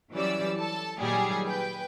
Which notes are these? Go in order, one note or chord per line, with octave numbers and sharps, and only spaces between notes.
E3 F#3 G3 C#4 D5 E6
A4 A5
A#2 D#3 F#3 G3 G4 G#4
B4 G5